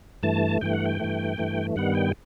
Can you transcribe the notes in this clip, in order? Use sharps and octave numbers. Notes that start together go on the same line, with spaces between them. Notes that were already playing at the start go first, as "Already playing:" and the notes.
G2 E3 A3 A5
G2 E3 A3 G5
F#5
G5
G2 E3 A3
G2 E3 A3
G2 D#3 G3 B3 F#5
G5